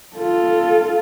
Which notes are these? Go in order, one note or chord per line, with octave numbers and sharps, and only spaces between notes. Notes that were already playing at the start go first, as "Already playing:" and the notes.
F4 A4